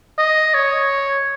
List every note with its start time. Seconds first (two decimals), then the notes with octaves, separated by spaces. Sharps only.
0.19 D#5
0.54 C#5